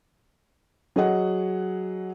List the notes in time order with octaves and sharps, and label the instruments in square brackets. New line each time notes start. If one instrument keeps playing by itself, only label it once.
[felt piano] F#3 G#4 D#5 F#5